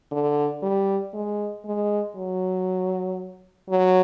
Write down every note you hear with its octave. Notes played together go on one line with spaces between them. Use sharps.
D3
G3
G#3
G#3
F#3
F#3